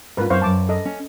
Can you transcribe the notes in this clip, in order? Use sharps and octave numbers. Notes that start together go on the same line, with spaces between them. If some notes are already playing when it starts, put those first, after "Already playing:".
G#2 C#4 F4 A#4 B4
F#2 C4 E4 C5 F5 C#6
F#2 G#5 A5 D6
A4 D#5
C#4